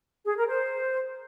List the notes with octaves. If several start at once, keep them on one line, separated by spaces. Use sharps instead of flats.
G#4
A#4
C5